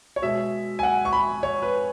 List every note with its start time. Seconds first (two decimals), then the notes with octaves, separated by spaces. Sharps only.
0.16 C#5
0.22 B2 G#3 E5
0.79 G#5
0.83 F#5
1.05 C#6
1.13 B5
1.43 C#5
1.63 B4